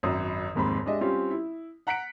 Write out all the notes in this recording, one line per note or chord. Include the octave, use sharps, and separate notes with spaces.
G#1 F#2 D#6
F1 D#2 G#2 C4 B5
G#3 D4 G4 D#5 E5
G3 C4 C#4 F4 G4
E4
F#5 A#5 F#6 B6 C#7 D7